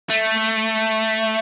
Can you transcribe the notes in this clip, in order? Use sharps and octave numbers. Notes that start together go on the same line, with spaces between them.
A3